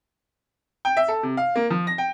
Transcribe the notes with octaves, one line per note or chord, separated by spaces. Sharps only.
G5
E5
A4
C3
F5
A#3
F3
A#6
G5